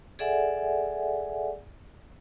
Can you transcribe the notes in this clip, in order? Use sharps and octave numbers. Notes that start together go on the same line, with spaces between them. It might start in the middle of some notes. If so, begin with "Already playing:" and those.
G#4 A4 D5 E5 F#5 G#5